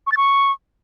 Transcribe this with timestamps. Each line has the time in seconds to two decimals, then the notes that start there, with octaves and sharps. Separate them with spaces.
0.07 C#6
0.12 A6
0.17 C#6